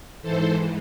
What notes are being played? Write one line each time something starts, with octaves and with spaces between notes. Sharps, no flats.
G#2 E3 A4 C5